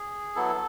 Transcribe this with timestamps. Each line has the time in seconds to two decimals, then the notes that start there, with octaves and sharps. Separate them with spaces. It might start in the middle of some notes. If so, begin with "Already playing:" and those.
Already playing: G#4
0.35 F#3 B3 E4 A4